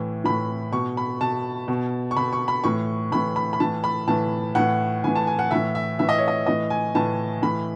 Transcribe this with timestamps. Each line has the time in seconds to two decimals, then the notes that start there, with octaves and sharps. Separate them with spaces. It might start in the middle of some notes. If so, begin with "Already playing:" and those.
Already playing: A2 E3
0.24 A2 E3 B5
0.72 B2 C#6
0.97 B5
1.21 B2 A5
1.68 B2
2.11 C#6
2.17 B2 B5
2.33 C#6
2.48 B5
2.64 A2 E3 C#6
3.12 A2 E3 B5
3.36 B5
3.53 B5
3.60 A2 E3 A5
3.84 B5
4.08 A2 E3 A5
4.55 A2 E3 F#5
5.04 A2 E3 G#5
5.16 A5
5.27 G#5
5.39 F#5
5.51 A2 E3 E5
5.75 E5
5.99 A2 E3 E5
6.09 D#5
6.18 C#5
6.28 D#5
6.46 A2 E3 D#5
6.70 G#5
6.95 A2 E3 A5
7.42 A2 E3 B5